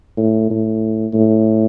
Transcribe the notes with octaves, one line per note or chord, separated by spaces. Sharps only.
A2
A2
A2